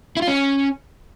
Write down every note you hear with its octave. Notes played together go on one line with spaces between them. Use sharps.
E4
F4
C#4